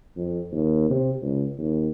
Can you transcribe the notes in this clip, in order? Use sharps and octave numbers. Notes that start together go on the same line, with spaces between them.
F2
D#2
C3
C#2
D#2